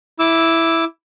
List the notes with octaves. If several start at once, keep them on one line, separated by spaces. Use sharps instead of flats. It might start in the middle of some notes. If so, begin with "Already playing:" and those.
E4 D6 E6